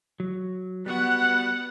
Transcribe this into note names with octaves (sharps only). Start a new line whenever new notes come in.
F#3
G3 B3 F#4 F#5 F#6